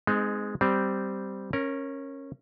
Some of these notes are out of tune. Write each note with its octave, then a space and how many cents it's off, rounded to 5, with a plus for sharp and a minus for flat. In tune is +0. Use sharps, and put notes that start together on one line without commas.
G#3 +0 C4 -45 D#4 -20
G3 -5 C4 -10
C#4 -15 A#4 +0